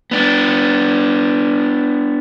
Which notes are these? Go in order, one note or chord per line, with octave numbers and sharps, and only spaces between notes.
B3 D4